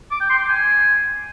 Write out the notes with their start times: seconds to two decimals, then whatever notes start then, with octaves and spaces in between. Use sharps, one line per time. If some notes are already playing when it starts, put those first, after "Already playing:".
0.11 D6
0.20 G5
0.30 C6
0.39 G5
0.48 G#5